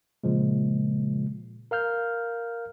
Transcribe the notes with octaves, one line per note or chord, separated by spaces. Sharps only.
A#2 C#3 F3 G#3
A#4 F5 F6 G6